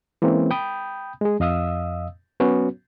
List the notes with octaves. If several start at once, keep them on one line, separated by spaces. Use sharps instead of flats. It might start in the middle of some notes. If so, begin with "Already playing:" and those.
E3 G#3 A#3 C4 C#4
G5 B5 D#6 G6
G#3 G#4
F2 D#5 F5 D#6 E6
F#3 B3 C#4 F#4